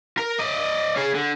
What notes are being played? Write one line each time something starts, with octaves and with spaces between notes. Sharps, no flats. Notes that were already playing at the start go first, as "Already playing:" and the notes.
A#4
D5 D#5
C#4 G#4
D3